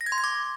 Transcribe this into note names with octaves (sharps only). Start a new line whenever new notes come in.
A#6
G#6
C6
G#6
D6